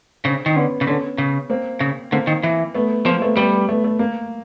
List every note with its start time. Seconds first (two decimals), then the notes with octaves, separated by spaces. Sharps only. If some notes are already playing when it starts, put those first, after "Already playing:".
0.25 C#3 C4 D4
0.46 D#3
0.56 D3 B3 C#4
0.81 C#3
0.87 D3 B3 C#4
1.18 C#3
1.50 A#3 C4
1.80 C#3
2.12 D3 A#3 C4
2.27 D#3
2.43 E3
2.74 A3 B3
3.05 F3 A#3 C4
3.21 A3 B3
3.37 G3 A3 B3
3.69 A3 B3
3.84 A3
3.99 A#3